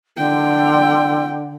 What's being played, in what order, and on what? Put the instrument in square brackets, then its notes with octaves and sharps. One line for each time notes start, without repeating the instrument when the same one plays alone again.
[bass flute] D3 [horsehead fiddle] G5